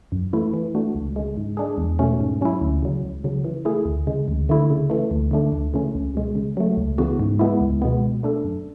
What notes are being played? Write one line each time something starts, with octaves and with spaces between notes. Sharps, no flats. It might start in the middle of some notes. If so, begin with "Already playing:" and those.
F#2
E3 A3 E4
E3
A3 D4 F#4
C#2
C#3 G#3
G#2
G#3 D4 G#4
E2
B2 A3 C#4
G#2
F#3 C#4 E4
D2
C#3 F#3
C#2
C#3 F#3
E3
A3 E4 G#4
D2
C#3 G#3
D2
D3 A3 E4
C#3
E3 A3
D2
D3 A3 D4
D2
C#3 E3 A3 C#4
C#2
B2 G#3
C#3
F#3 A3
C#2
C#3 E3 B3 F#4
G#2
G#3 B3 E4
C#2
B2 G#3 B3
B2
A3 D4 A4
F#2